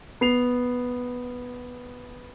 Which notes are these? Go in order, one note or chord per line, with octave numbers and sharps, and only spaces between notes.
B3 C7 F7